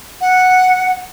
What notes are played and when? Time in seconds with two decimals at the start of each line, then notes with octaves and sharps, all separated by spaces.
0.21 F#5